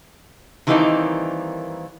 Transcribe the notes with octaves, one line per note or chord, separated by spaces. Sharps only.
D#3 E3 G3 A#3 C4 D#4